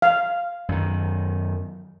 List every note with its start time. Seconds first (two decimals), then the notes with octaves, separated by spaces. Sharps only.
0.02 F5
0.69 F#2 D#3